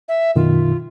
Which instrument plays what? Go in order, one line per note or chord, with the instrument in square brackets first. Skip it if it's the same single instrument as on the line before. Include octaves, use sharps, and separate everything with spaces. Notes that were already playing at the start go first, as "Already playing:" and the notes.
[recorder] E5
[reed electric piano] F#2 B2 D#3 [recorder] F4